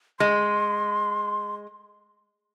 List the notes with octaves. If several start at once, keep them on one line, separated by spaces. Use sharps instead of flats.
G#3 C6